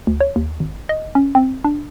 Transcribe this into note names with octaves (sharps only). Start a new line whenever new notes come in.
D2
C#5
D#2
G#1
D#5
C#4
C4
D4